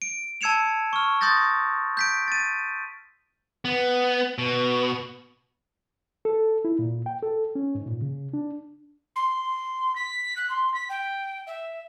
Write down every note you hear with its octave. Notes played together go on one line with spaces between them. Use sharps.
D7
A5 E6 G#6 C#7 E7 F7
C#6 F6
C6 D#6 G6 A6 A#6
G6 B6 D7
A6 D#7
B3
B2
A4
E4
A#2
G5
A4
C#4
G#2
A#2
C#3
D4
C6
B6
F#6
C6
B6
G5
E5